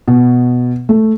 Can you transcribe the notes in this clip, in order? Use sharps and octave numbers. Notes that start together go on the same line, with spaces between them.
B2
A3